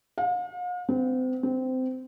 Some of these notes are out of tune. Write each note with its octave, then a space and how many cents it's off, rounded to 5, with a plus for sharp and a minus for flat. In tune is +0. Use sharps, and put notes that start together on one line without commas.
F5 +45
C4 -35
C4 -20